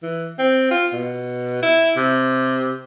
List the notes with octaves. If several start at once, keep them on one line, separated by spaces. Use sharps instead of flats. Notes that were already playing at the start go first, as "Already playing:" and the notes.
E3
C4
F4
B2
E4
C3